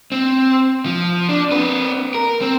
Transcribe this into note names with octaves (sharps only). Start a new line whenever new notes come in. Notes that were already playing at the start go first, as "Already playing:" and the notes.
C4
F3
D4
C4 B4
A#4
C4